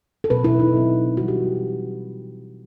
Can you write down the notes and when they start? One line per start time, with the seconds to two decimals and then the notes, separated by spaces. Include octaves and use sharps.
0.24 A4
0.30 B2 F#3 C4 B4
0.44 E4
0.60 D#4
0.74 B2 F#3 C4
1.17 E3 G3 C4 F#4
1.28 G4